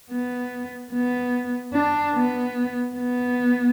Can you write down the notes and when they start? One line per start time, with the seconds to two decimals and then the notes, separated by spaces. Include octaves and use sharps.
0.11 B3
0.92 B3
1.73 D4
2.14 B3
2.96 B3